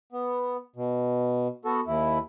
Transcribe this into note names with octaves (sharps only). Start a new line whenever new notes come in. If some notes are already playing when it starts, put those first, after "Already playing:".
B3
B2
B3 F#4 A4
D#2 E4